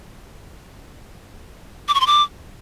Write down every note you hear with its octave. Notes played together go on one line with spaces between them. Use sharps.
D6
C#6
C6
D6